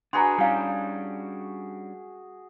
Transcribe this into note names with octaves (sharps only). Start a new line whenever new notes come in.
D4 F#4 G#4 B4 G5 A#5 C6
G3 C#4 D4 E4 F5